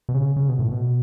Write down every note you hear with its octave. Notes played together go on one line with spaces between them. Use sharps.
B2
C#3
C#3
B2
A2
B2